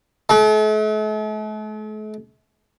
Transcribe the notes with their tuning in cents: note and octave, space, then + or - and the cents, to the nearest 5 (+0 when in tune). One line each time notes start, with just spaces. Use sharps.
A3 -45